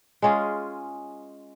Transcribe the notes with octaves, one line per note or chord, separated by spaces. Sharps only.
G#3 C#4 F4 G#4